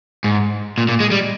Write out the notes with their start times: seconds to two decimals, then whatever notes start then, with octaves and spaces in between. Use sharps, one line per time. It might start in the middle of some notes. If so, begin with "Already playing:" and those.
0.24 G#2
0.78 A#2
0.89 A#2
1.00 G#3
1.11 G3